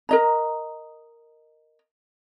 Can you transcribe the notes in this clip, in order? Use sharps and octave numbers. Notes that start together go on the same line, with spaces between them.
A#4 D#5 A#5